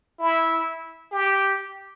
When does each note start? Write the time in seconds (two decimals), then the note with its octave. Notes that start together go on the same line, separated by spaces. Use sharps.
0.19 E4
1.11 G4